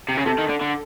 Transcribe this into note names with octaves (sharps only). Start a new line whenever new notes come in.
C3
C#3
C3 A4
D#3
D3
D3